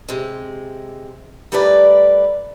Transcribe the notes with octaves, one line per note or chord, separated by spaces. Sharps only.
C3 G#3
G3 A3 A#4 B4 D5